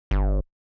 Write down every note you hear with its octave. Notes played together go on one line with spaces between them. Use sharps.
G1